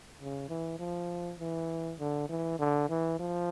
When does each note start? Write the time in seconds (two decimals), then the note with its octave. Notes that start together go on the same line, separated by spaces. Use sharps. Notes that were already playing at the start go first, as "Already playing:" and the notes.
0.20 C#3
0.49 E3
0.79 F3
1.39 E3
2.00 D3
2.29 E3
2.59 D3
2.90 E3
3.20 F3